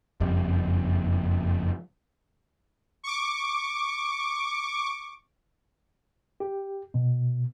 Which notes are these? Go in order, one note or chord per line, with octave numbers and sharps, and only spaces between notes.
F#1 F2 G3
C#6 D6
G4
B2